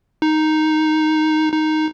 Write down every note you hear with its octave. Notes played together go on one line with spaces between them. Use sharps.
D#4
D#4